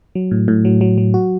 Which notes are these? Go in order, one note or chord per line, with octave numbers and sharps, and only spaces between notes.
F#3
A2
A2
F#3
F#3
F#3
F#4